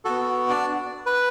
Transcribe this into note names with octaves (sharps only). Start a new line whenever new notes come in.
B3 F#4 A4
D4 D5
B4